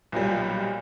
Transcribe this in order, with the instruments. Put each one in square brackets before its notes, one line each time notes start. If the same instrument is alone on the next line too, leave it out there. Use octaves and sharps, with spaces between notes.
[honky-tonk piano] B1 A#2 F#3 G3